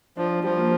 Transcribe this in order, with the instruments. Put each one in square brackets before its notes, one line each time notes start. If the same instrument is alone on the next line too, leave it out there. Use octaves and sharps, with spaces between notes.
[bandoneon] F3 [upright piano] D4
[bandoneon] F3 [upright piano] G3
[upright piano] A#3